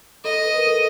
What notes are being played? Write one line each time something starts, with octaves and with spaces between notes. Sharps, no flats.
A4 D#5
B4
A#4
A4